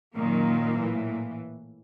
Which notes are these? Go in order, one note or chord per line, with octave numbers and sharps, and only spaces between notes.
F#2 A#2 D#3 F#3 A#3
A2 E3